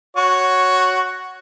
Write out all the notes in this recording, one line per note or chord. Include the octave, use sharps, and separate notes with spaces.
F#4 C#5